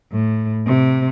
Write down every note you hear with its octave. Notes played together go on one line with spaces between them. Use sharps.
A2
C3